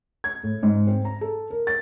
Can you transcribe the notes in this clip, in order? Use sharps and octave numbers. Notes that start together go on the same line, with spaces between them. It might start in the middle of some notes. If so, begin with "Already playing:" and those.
G#6
A2
G#2
C4
A#5
A4
A#4
A6